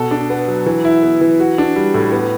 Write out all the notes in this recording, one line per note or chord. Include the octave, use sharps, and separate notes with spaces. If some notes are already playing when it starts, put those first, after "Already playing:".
Already playing: B2 A4
D4
B3
F#3
E3
E4
B3
E3
F#4
D4
G3
A2
B3